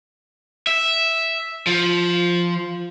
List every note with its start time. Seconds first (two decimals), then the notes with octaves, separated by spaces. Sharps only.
0.67 E5
1.67 F3